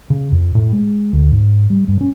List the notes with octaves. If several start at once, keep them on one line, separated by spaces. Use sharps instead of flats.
C#3
F2
A2
G#3
D2
G#2
G3
G2
C#4